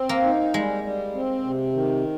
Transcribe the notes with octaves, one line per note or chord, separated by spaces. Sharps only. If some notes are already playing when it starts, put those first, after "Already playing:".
Already playing: C4
A#3
D#4
G3 G#3
G3
C4
C3
D#3